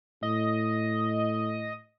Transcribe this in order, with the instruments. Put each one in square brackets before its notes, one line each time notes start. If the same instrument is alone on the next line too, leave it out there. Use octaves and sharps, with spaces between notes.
[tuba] A2 [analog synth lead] D#5